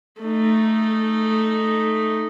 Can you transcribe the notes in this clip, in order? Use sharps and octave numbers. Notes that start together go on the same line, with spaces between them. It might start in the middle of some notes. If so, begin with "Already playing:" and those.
A3 D#4